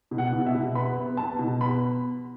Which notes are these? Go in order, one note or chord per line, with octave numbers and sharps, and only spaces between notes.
B2
F#5
B2
E5
B2
B3 B5
B3
B3 A5
B2
B3 B5